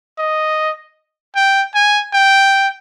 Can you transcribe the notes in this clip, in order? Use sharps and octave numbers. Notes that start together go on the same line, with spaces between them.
D#5
G5
G#5
G5